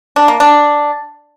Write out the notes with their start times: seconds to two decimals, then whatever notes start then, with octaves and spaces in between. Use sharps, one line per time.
0.16 D4
0.28 A#3
0.40 D4